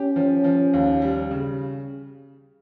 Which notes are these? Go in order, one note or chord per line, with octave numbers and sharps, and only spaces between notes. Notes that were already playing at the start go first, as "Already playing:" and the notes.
Already playing: C#4 G4
F3
F3
D#2
G3
C#3